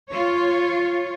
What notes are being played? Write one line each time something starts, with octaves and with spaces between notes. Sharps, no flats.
F4 C#5